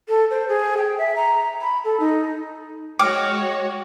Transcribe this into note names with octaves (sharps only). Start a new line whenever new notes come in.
A4
C5
G#4
G5
E5
A#5
B5
A4
D#4
G#3 F#4 C#5 G5 D6 F6